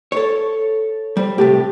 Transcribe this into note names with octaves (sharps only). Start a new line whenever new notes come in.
A4 C#5
G3 C5
A2 C3 G4 A4